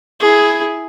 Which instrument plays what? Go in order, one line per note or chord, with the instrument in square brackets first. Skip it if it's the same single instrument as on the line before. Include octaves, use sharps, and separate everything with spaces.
[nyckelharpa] E4 G#4